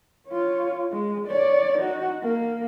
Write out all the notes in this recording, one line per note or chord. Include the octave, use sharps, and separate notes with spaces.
F4 C#5
G#3
C#5 D5
D#4 F#4
A#3